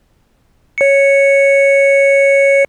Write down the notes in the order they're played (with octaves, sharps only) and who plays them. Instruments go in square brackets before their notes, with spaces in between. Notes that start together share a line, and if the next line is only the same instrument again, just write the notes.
[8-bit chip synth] C#5 C#7